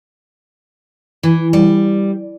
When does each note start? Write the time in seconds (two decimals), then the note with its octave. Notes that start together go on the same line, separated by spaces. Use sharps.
1.23 E3
1.53 G3